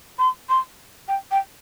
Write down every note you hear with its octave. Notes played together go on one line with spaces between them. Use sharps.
C6
C6
G5
G5